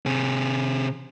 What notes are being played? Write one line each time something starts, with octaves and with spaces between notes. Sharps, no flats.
C3 G#4